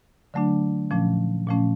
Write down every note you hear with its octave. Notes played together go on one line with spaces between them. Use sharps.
D3 F#3 A3 D4
A#2 F3 A3 C#4
A#2 F3 A3 C#4